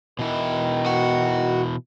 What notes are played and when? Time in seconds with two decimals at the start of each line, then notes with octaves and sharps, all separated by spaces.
0.19 B2 D#3 E3 E4
0.86 F#4